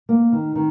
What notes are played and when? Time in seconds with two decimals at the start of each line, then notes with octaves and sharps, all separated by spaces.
0.09 A#3
0.32 D#3
0.55 D#3